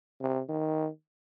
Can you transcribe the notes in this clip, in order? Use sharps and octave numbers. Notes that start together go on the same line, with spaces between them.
C3
D#3